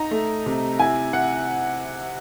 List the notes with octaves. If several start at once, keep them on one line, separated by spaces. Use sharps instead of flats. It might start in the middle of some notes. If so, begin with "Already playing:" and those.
Already playing: D#4 A#5
A3
C3
E4 G#5
E4 F#5